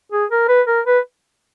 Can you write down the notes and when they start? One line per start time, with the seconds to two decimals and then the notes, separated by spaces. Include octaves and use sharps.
0.12 G#4
0.30 A#4
0.49 B4
0.68 A#4
0.86 B4